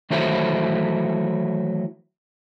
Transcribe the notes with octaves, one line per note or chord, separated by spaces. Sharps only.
D#3 E3 F#3 A3 E4 C5